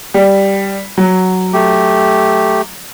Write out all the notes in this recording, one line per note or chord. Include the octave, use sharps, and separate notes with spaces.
G3
F#3
A3 G4